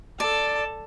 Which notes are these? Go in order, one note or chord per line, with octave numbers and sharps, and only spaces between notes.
A4 D5 A5